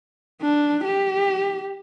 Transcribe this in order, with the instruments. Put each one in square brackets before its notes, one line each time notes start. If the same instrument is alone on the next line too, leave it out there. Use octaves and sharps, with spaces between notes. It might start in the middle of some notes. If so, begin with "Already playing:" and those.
[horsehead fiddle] D4
G4